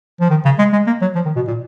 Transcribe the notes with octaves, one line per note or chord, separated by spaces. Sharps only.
F3
D#3
C#3
G#3
G#3
A#3
F#3
F3
D#3
B2
A#2